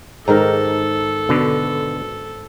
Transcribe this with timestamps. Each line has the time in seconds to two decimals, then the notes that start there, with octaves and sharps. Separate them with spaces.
0.28 G#2 D#3 A4 A#4 A#5
1.29 B2 D3